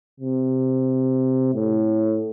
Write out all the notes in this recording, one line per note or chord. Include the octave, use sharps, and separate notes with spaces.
C3
A2